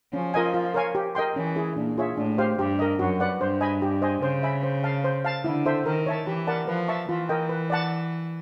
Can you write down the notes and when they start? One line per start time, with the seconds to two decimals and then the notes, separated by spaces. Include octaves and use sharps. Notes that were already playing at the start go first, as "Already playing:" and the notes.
0.13 F3 C#4
0.34 F4 A#4 D#5 G#5
0.54 F4
0.74 A#4 C#5 F5 G#5
0.95 G4
1.15 A#4 D#5 G5 C6
1.36 E3 C#4
1.56 E4 G#4
1.77 A#2 D4
1.97 F4 G#4 C#5 E5
2.17 A2 D4
2.38 G4 C5 F5
2.59 G2 G4
2.79 A#4 D#5
2.99 F#2 F#4
3.20 B4 D5 F#5
3.40 G2 C5
3.61 D#5 G#5 B5
3.82 G4
4.02 C5 D#5 G#5
4.22 C#3 C5
4.43 E5 G#5 B5
4.63 C5
4.84 F5 A5
5.04 C5
5.25 F5 A5
5.44 D3 E4
5.66 A4 C5 E5
5.86 D#3 A#4
6.06 C#5 E5 A5
6.27 E3 G4
6.47 A#4 D5 F#5 A5
6.68 F3 B4
6.88 E5 A5 C#6
7.09 E3 F4
7.29 A#4 D#5 G5
7.49 B4
7.70 D5 F#5 A5